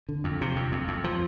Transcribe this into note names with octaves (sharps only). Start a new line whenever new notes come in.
D3
F2
C3
F2
F2
F2
F3